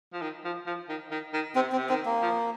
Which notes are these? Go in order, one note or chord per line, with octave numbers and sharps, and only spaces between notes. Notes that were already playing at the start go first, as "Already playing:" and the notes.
F3
D#3
F3
F3
D#3
D#3
D#3
C3 C4
C4
C3
D#3 C4
A#3
F3